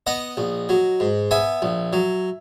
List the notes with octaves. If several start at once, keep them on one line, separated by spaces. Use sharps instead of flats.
B3 D#5 F#5
A#1
F#3
G#2
B3 E5 G#5
A#1
F#3